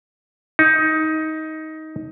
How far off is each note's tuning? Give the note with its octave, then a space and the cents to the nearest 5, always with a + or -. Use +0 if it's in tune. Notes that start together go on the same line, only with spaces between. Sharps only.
D#4 +15